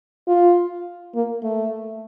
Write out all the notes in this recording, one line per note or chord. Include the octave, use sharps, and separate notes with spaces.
F4
A#3
A3